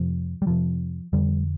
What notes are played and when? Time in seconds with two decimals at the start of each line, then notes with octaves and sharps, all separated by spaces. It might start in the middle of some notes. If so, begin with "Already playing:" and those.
Already playing: F2 C3 F3
0.42 G3
0.46 F2 C3 F3
1.13 F2 D3 G3